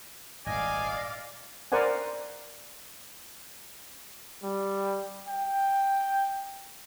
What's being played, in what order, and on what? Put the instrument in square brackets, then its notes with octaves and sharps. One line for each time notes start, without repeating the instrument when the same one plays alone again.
[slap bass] D#1 G#1 [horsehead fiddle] D5 F5 [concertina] D#5 [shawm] G#5
[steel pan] A#4 C5 D5 F#5 G#5
[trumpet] G3
G5